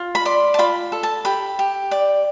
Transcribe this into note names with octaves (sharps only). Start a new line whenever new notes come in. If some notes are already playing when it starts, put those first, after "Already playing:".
Already playing: F4
B5
D5 C6
A5
F4 B5
A4
A5
G4 B5
G4
D5